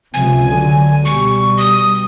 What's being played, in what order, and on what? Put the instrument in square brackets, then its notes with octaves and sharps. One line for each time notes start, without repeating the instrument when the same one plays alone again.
[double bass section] C#2 C3 F3 [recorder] G#5
[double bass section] D3 F#3
[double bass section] B2 G3 [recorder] C#6
[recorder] D#6